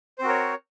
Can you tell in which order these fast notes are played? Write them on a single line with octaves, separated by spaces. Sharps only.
C5 C4 F#4 A#4 C#5